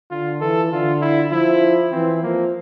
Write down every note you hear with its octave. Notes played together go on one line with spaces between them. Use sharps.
D3 F4
E3 A4
D3 F4
E4
F3 E4
E3 C4
F3 A#3